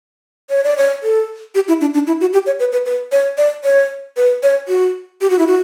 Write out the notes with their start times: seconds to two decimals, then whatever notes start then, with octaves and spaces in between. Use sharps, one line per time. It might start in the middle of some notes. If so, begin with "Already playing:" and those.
0.50 C#5
0.64 D5
0.77 C#5
1.03 A4
1.55 G4
1.68 E4
1.81 D4
1.94 D4
2.07 E4
2.21 F#4
2.33 G4
2.46 C#5
2.59 B4
2.72 B4
2.86 B4
3.12 C#5
3.38 D5
3.64 C#5
4.17 B4
4.43 C#5
4.68 F#4
5.21 G4
5.30 F#4
5.39 E4
5.47 F#4